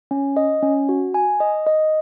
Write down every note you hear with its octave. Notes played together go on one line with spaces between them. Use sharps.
C#4
D#5
C#4
F#4
G#5
D#5
D#5